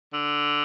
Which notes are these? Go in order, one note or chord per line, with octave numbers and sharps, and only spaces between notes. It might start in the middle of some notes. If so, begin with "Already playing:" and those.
D3